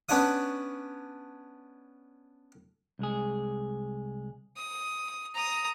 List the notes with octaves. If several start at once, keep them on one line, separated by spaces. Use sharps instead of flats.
B3 C#4 D4 C#5 F#5 D#6
C2 G#3 G#4
D#6
A#5 D#6